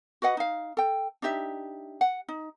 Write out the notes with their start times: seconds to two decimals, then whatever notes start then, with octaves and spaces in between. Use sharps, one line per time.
0.22 F#4 B4 D#5 F#5
0.37 D#4 F5
0.77 A4 G5
1.22 D4 D#4 G4 E5
2.01 F#5
2.28 D#4